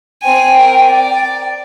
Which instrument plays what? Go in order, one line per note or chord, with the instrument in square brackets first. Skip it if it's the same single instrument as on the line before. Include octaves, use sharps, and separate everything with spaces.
[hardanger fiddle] C4 G#5 [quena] G5
[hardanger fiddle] A#4
D5